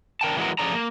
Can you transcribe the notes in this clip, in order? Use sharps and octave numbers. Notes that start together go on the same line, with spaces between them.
D4 A#4 G5 A5
E3 F#3 G#3 D#4 F#4 A#4
F3 C#4 G#4 A4 D5 A#5
A#3